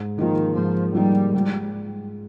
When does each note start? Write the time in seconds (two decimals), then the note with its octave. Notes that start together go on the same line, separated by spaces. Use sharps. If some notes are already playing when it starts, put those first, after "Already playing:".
Already playing: G#2
0.18 D#3 F3 A#3 D#4
0.56 G#2 F3
0.95 F3 G3 A#3 D#4
1.34 G#2 G3